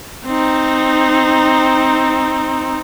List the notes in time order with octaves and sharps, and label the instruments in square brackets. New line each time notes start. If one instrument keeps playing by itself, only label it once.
[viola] C4 D#4